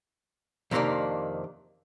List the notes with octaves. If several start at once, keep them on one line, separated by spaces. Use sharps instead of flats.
F2 C3 D#3 A3 A#3 D4